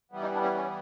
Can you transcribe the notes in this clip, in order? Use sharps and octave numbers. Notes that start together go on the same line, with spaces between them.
E3 G3 B3
D#4
D4
C#4
C#4